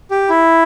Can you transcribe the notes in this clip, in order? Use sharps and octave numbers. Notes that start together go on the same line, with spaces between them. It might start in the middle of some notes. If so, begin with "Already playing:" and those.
G4
E4